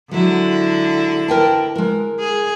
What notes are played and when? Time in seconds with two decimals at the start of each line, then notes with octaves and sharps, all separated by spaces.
0.11 D3 F#3 G#3 E4
1.28 A#4 G5 A5
1.76 G#3 A#4
2.20 G#4